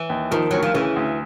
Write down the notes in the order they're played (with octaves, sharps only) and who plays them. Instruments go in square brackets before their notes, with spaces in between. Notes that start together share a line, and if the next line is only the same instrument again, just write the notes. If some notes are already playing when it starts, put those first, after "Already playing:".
Already playing: [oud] E3
[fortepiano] D#2
[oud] D#3 [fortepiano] F3
[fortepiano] D2 [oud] F#3
[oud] F3
[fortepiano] C#3 [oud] E3
[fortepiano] D2